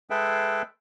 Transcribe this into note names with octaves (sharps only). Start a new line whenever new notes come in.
G#3 G#4 A4 B4 E5 G5